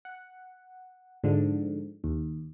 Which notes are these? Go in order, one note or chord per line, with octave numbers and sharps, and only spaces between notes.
F#5
G#2 D3 F3
D#2